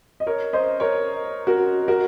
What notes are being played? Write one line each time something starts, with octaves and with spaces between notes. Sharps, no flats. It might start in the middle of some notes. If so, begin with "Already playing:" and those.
D#5
A#4 C#5
C5 D#5
A#4 C#5
F#4 A#4
F#4 A#4